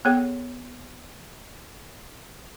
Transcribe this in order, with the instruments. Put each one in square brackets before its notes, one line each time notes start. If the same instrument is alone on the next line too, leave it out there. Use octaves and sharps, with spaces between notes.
[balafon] B3 G#4 A4 C#5 G5